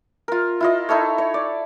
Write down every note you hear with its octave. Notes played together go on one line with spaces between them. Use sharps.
F4 A#4
E4 F4 D#5
D#4 E4 A4 C#5
C#5
D5